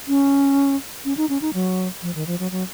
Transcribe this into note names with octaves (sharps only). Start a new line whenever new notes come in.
C#4
C#4
D#4
C#4
D#4
F#3
F3
D#3
F3
F#3
F#3